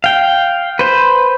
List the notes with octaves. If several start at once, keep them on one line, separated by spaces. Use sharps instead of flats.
F5 G5
B4 C5